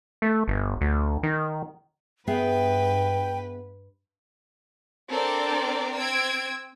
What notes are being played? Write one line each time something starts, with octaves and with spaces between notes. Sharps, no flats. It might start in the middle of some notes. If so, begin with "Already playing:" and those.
A3
G1
D2
D#3
G2 B3 G#4 B4 E5 G5
C4 D4 A4 A#4 C5 D5
C4 E6 G#6 D7